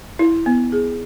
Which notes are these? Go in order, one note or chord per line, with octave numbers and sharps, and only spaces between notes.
E4
B3
G#4